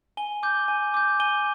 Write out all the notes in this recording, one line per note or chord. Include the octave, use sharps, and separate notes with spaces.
G#5 G7
D6 G6
G#5
D6 G6
G#5 G7